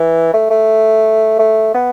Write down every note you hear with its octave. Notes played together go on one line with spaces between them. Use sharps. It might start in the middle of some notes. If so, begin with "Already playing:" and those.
Already playing: E3
A3
A3
A3
B3